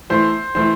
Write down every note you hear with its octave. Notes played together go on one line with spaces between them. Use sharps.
E3 A3 E4 C5
E3 A3 E4 C5